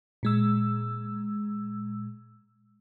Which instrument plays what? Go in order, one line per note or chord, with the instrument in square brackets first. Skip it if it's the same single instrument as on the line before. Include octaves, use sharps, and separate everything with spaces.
[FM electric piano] A#2 G#3 E6